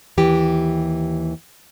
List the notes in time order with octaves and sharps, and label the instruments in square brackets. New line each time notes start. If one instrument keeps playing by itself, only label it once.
[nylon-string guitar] D#2 E3 G4